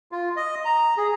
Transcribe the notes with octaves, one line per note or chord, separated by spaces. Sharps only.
F4
D#5
A#5
G#4